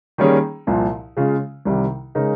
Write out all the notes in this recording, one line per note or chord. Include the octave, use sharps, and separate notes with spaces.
D#3 G3 A#3 C#4 G#4
C2 A#2 F3
C#3 G#3 C#4 F4
C2 C3 D#3 G3
C#3 G#3 D#4 A#4